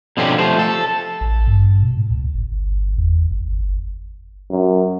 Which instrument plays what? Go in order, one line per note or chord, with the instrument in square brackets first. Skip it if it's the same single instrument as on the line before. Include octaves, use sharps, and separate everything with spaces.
[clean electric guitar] B2 D3 F3 C4 C#4 G4
F3 A3 G4 C5
A4
[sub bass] A1
G2
B2
A2
C#2
G1
E2
G1
[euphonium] F#2